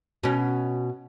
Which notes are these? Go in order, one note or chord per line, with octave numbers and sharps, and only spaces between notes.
B2 C#4